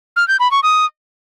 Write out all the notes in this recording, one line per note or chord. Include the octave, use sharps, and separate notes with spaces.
F6
G6
B5
C#6
D#6